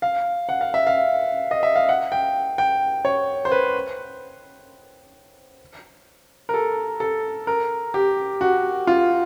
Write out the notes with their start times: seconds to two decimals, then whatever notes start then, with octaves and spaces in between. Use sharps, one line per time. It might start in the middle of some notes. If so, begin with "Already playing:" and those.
0.02 F5
0.49 F#5
0.61 F5
0.74 E5
0.87 F5
1.51 D#5
1.63 E5
1.76 F5
1.89 F#5
2.12 G5
2.58 G5
3.05 C#5
3.45 C5
3.51 B4
6.49 A#4
6.54 A4
7.00 A4
7.47 A#4
7.94 G4
8.41 F#4
8.87 F4